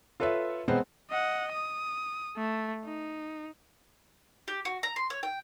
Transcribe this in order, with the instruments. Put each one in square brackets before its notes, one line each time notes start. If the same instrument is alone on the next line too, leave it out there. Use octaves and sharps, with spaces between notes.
[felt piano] F4 A4 B4 C#5 E5
E1 G#3 B3 C4 C5 F#5
[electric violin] D#5 F#5
D#6
A3
D#4
[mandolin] G4
F#4
A#5
C6
C#5
G5